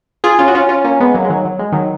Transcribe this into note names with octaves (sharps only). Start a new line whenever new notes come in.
F4 G#4
C#4 F4
F#4
C#4 F4
C#4 F4
A#3 C#4
G#3 B3
F#3 A#3
G#3
D#3 F#3
F#3
G#3
D#3 F#3